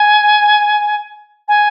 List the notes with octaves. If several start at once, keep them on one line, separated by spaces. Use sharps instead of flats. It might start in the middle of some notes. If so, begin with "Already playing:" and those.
Already playing: G#5
G#5